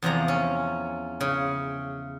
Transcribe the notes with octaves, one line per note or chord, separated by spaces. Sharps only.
E2 C3 F3 A#5
C#4
C#3